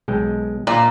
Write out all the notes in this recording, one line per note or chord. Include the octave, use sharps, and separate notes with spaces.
B1 G#3 G5
A#2 D5